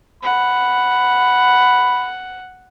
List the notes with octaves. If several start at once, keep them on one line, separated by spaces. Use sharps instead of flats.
F#5 B5